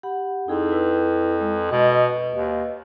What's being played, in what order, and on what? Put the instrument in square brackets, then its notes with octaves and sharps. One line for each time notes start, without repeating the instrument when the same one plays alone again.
[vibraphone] G4 F#5 B5
[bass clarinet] F2 [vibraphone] D#4 E4 G#4
[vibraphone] E4 B4
G#3
[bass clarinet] B2 [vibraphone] B4 D#5
[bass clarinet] D#2